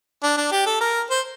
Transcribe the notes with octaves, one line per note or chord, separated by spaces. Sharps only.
D4
D4
G4
A4
A#4
C5